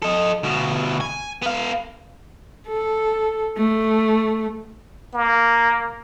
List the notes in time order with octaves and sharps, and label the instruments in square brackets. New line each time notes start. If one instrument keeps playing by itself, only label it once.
[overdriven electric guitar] A4 D#5
D2 B2
G#5
B3 F5
[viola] A4
A3
[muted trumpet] A#3